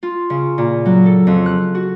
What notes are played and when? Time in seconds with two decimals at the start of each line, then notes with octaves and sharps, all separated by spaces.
0.03 F4
0.30 C#3
0.58 A#2
0.86 F#3
1.06 A4
1.27 F2
1.46 F#6
1.75 F#4